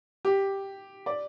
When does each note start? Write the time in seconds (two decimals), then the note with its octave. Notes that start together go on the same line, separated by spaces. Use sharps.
0.25 G4
1.06 D5